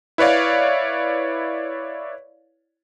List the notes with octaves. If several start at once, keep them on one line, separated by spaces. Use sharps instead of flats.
E4 B4 C#5 D5 F5